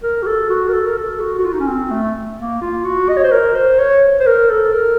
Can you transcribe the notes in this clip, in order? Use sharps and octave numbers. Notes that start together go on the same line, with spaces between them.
A#4
F#4
A4
F#4
A#4
A4
A#4
A4
F#4
F#4
F4
D#4
C#4
C4
A3
A#3
F4
F#4
D#5
C#5
C5
A#4
C5
C#5
C5
A#4
A4
A#4